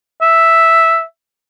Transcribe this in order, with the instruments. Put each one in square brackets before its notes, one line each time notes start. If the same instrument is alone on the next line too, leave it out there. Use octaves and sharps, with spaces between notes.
[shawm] E5